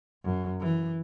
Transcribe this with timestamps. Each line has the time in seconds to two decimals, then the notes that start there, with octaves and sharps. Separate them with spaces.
0.24 F#2
0.60 E3